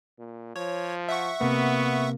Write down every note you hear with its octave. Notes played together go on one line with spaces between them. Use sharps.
A#2
F3 C#5
E5 F#5 C#6
C3 A#3 B3